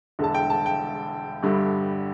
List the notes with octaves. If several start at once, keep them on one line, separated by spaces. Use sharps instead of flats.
E1 E2 D3 A5
G5
A5
G5
G1 G2 D3 G3